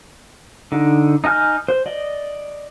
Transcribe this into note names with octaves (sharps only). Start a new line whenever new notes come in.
D3 D#4
D#4 D#5 G#5 F6 G6
C5
D5 D#5